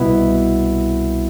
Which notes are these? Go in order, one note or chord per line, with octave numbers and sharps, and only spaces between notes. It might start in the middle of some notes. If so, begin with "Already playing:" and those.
Already playing: C2 B2 B3 E4